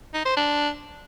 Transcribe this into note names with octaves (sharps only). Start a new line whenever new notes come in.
D#4
C5
D4